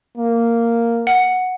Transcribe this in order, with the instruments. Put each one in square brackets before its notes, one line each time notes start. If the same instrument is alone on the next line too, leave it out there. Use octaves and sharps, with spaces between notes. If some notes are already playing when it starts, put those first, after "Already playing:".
[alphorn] A#3
[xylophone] F#5